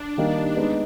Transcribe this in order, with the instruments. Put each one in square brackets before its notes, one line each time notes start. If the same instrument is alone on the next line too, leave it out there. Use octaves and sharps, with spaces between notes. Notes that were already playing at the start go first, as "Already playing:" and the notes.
Already playing: [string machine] D4
[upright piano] D#3 G3 A#3 D#4 G4
G#3 B3 D#4